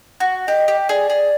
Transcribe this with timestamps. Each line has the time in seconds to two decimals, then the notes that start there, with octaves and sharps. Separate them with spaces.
0.20 F#4
0.48 G4 D#5
0.68 G4
0.89 G#4 D5
1.10 G#4